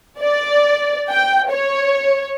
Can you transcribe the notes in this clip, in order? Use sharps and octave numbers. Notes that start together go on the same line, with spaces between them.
D5
G5
C#5